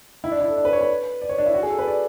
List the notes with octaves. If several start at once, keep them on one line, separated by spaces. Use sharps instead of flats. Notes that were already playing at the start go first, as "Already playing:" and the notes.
E4
D4
E4
A4
D4
B4
C#5
B4
D5
C#5
D4
E4
F#4
G#4
A4
B4
D5